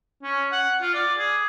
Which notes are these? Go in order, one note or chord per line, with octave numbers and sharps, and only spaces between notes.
C#4
F#5
F4
D5
G#4